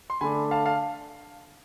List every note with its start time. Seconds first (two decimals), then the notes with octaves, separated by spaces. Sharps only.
0.10 C6
0.21 D3 A3 D4 G#5 B5
0.51 F5 A5
0.66 F5 A5